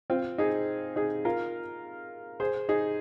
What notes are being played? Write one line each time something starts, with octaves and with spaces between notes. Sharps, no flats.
C4 F4
D#4 G#4
D#4 G#4
F4 A#4
G#4 C5
D#4 G#4